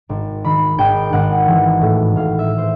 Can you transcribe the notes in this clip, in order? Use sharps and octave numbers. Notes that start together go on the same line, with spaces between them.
G#1
D#3 B5
G#1 G5
G#1 F#5
E3
A2
A2 F5
E5
C5